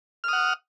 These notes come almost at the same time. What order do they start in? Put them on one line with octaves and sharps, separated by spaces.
F6 D#6 F#5